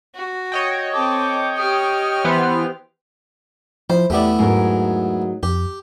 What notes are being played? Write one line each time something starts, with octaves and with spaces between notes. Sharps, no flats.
F#4
C#5 D#5 G5
C4 A4 D6
G4 D#6 F6
E3 B3 C5
F3 E4 C5
E2 A3 B3 E4 G4 D5
G#2 F#3 A#4
F2 G4